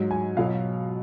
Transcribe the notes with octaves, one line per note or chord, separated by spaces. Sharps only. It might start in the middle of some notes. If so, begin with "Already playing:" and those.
Already playing: G#2 F#3
G#5
B2 F#3 F5